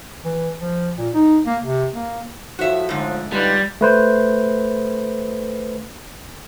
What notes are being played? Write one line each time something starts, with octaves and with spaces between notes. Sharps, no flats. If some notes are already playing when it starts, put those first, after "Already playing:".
E3
F3
A#2
D#4
A#3
C3
A#3
A2 F3 F#4 E5
G#2 D3
G3 D#4 F4 B4
A3 B4 C5